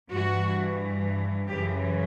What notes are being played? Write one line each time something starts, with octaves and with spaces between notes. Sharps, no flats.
G2 E3 F#4
F#2 C#3 E3 G4